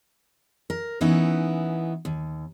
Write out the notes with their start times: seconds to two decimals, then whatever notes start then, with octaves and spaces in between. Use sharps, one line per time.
0.70 A#4
1.01 E3 B3 C#4 D#4 E4
2.05 D#2